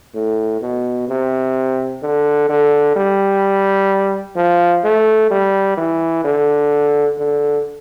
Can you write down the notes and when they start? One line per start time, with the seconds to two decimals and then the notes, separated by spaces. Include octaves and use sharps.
0.14 A2
0.61 B2
1.08 C3
2.02 D3
2.49 D3
2.96 G3
4.36 F3
4.84 A3
5.31 G3
5.77 E3
6.24 D3
7.18 D3